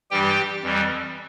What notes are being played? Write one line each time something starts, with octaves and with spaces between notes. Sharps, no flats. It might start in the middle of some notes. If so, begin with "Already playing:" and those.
G2 E3 G3 G4 G5
F2 E3 G3